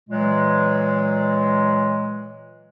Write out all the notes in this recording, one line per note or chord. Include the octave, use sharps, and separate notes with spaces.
A#2 E3 F#3 G#3